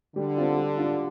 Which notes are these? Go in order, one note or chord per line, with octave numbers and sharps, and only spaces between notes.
D3 G3
C4 F4
G3
D4 F4